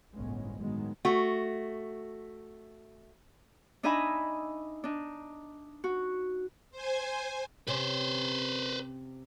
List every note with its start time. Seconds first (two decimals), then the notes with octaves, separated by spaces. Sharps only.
0.14 G1 C2 A2 G#3 B3 C#4
0.57 A2 D#3 F#3 G#3 B3
1.05 A3 F#4
3.83 D4 D#4 D#5 E5 G#5 B5
4.84 D4 D#4
5.84 F#4
6.71 C5 G#5
7.68 C3 C#4 B4 C5